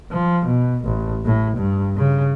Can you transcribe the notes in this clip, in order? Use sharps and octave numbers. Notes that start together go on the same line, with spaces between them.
F3
B2
A1
A2
G2
C#3